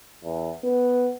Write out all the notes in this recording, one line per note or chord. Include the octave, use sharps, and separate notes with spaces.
E2
B3